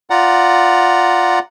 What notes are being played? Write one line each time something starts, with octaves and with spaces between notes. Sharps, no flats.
F4 D5 F#5 A#5